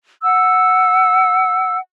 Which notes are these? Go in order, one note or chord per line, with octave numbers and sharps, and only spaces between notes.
F#5 E6